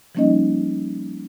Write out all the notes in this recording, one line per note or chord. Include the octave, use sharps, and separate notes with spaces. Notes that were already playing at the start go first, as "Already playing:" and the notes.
F3 G3 A#3 C#4 D#4 D#5